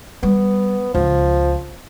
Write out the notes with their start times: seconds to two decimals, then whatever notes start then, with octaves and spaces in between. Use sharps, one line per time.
0.23 G3 B3
0.94 C#2 F3